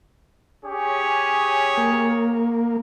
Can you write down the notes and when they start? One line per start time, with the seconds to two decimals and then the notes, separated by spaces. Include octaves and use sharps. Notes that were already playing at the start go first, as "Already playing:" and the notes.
0.65 C#4 G4 G#4 C#5
1.77 A#3